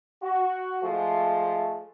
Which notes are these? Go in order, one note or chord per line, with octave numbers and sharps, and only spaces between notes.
F#4
F3 G#3 A3